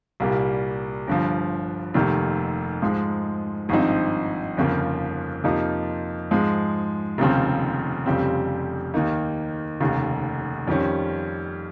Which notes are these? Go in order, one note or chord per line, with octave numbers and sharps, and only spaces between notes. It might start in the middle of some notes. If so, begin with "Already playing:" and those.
C2 A#2 G3 A#3
G1 G2 F3
F1 F2 C3 D#3 A#3
G#2 F3 G#3
G#1 G2 F3 C4 D#4
G1 F2 C#3 F3 A#3
F2 C3 F3 A#3 D#4
G#2 F3 G#3
F1 D#2 C#3 F3 C4
F1 F2 C#3 G3 C4
D#2 D#3 A#3 D#4
F1 D#2 C#3
F2 D#3 G3 C#4